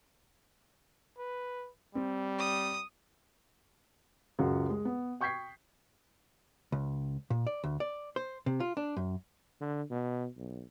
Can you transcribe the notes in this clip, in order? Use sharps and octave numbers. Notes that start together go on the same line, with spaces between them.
B4
G3 C4
D#6
C#2 F#2 F4 F#4 G#4
G#3
B3
G5 C#6 G6 G#6 B6 C7
C#2
A#2
D5
D2
D5
C5
C3
F4
D4
F#2
D3
B2
B1